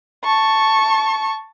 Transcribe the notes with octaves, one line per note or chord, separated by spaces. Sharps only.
A5 C#6